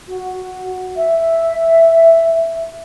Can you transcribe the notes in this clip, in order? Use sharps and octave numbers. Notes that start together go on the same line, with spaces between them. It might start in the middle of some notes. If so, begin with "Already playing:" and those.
F#4
E5